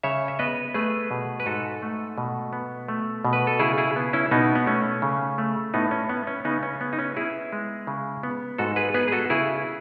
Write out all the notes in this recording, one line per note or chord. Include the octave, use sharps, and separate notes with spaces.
C#3 C#5 E5
E5
B3 B4 D#5
A3 G#4 B4
B2
B4
G#2 F#4 A4
A3
B2
B3
A3
B2
B4
A4
C#3 E4 G#4
E4 G#4
B3
C#4 E4
B2 B3 D#4
B3
A3 C#4
C#3
A3
A2 B3 D#4
C#4
B3
C#4
C#3 B3 D#4
C#4
B3
D#4
C#4
B3 E4 G#4
G#3
C#3
B3
G#2 F#4 A4
G#4 B4
B3 G#4 B4
G#4
F#4 A4
C#3 E4 G#4